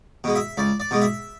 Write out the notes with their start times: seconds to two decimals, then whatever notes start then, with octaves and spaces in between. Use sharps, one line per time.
0.24 B2 G#3
0.35 E5
0.57 C#2 D5
0.80 D5
0.91 B2 G#3
1.02 E5